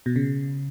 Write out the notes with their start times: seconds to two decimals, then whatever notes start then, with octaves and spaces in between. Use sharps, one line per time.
0.06 B2
0.16 C#3